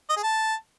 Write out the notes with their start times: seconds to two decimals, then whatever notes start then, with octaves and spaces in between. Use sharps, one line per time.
0.10 D#5
0.17 G#4
0.24 A5